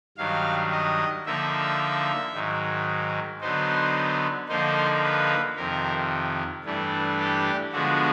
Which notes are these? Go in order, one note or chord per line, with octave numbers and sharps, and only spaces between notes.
G2 D#3 F#3 F5
D#5
D3 F3 A#3 D#4 E5
G#2 D#3 F#3
D3 F#3 B3 D#4 C5
D3 F3 A#3 D#4 C5
B4
F2 C3 D#3 A#4
G2 E3 A3 D4
G4
D3 F3 G#3 B3 F#4